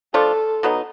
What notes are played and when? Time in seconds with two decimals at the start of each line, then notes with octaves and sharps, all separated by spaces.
0.14 F3 A3 D4 F4 A4
0.63 B2 F#3 B3 D#4